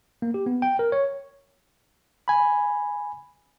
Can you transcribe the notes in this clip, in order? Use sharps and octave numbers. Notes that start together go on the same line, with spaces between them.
A#3
G4
B3
G5
A#4
C#5
G#5 B5